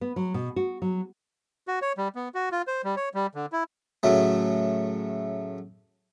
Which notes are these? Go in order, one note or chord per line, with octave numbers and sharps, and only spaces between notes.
B3
F#3
B2
F#4
F#3
F#4
C#5
G3
B3
F#4
F4
C5
G3
C#5
G3
D3
E4
A2 C#3 F#3 A3